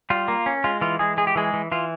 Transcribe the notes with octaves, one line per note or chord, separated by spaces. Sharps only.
G3 F4
A#3
C#4
G#3 F4
E3 F4
E3 G#3 G#4
G#3 G#4
G4
E3 G#3 G#4
E3
E3 F4